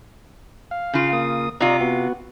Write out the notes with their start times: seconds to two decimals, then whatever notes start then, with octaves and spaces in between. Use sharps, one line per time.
0.71 F5
0.93 C#3 F4
1.13 A#3 D#6
1.61 C3 F4 D5 D#5 A#5
1.81 B3 F#4